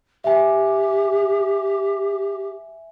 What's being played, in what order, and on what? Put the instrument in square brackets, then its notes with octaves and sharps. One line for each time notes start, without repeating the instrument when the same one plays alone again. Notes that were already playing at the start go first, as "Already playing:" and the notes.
[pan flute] G4 [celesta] E5 G#5